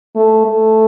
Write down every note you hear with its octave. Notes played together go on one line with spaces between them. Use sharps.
A3
A3